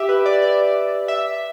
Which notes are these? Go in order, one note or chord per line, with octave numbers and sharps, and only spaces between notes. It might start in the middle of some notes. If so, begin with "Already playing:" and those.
Already playing: G4 E5
B4
D5
D5
E5